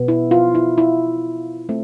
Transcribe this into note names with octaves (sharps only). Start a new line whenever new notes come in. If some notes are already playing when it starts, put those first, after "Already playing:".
Already playing: B2 B3
E4
F4
E4
E4
A3 C4